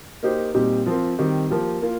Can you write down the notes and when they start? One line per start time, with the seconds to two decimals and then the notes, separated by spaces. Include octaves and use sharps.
0.23 A#3 D#4 G4 C5
0.54 A#2 G3 C4 D#4 G4
0.86 F3 C4 F4 A#4
1.18 D#3 G3 C4 G4
1.50 F3 A#3 G4
1.82 A#3 F4